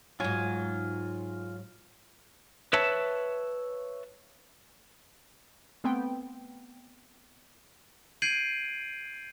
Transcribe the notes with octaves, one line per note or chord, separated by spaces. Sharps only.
G#2 F#3 F4 G#5
B4 C#5 E5 A5
A3 B3 C4 G5
G6 G#6 C7 D7 D#7 F#7